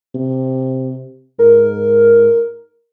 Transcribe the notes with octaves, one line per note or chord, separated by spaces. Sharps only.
C3
G#2 A#4